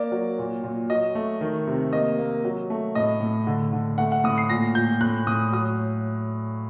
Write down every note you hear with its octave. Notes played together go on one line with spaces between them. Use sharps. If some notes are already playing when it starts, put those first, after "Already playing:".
Already playing: A#3 D5
F#3
A#2
A#2
F#3 D#5
A3
D#3
C3
A#3 D#5
A#3
F#3
A3
A2 D#5
A2
D3
D3
A3 F#5
F#5
A2 D#6
C7
A#2 A#6
A#2 G6
A2 F#6
A2 D#6
F#3 D#6